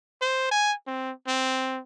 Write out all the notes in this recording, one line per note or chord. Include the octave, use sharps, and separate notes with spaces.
C5
G#5
C4
C4